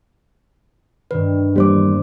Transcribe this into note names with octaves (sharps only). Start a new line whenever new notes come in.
G2 D#3 B4
E2 G3 A#3 C5 D6